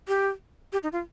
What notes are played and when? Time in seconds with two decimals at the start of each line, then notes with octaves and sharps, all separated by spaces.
0.08 G4
0.73 G4
0.83 D#4
0.93 F4